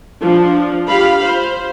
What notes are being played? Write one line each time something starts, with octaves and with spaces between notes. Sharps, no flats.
F3 D4
F4 G4 F5 B5
C5